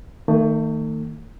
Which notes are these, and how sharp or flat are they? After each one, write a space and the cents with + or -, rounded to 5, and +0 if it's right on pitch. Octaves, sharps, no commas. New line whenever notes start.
D#3 +0 A3 +35